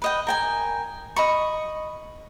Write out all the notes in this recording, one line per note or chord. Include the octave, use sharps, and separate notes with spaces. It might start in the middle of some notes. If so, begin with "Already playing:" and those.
B4 D#5 G5
A#4 G5 G#5
D#5 B5 C#6